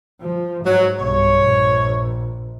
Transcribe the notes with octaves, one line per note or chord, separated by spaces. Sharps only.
F3
G#2 F#3
B1 G2 C#5
A#1